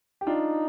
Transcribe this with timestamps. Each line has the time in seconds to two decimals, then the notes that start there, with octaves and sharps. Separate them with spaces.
0.21 G4
0.26 D4 D#4 F4